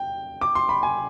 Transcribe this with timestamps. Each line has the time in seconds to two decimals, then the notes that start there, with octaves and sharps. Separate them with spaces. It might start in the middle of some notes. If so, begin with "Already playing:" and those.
Already playing: G5
0.41 D6
0.55 C6
0.69 B5
0.83 G#5